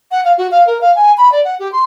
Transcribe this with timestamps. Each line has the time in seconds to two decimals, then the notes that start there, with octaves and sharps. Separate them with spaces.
0.11 F#5
0.25 F5
0.38 F#4
0.51 F5
0.67 A#4
0.81 F5
0.95 G#5
1.17 B5
1.32 D5
1.45 F#5
1.60 G4
1.72 C6